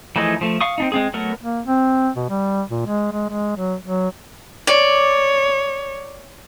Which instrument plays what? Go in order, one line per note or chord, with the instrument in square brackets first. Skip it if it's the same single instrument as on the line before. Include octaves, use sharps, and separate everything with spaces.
[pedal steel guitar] E3 F3 A3 D#4 G#4
F3 A3
F5 C#6 D#6
C4 D4 D#4
G#3 C4 G#4
F#3 A3 B3 A#4
[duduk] A#3
C4
B2
G3
A#2
G#3
G#3
G#3
F#3
F#3
[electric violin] C#5 [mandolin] D5